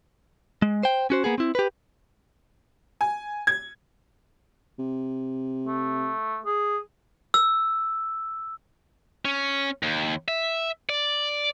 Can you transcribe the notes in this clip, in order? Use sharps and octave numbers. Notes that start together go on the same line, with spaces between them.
G#3
C5 G5
C#4 F#4 C5
A#3 B3 G#4
C4 E4
G4 B4
G#5
G#6
C3
A3
G#4
E6
C#4
D#2
E5
D5